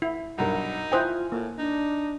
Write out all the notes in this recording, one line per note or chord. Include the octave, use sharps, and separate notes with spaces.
E4
B1 G2 D#4 A#4
E4 F4 C5 G5 G#5 D#6 F#6
A2 A#3
D4 D#4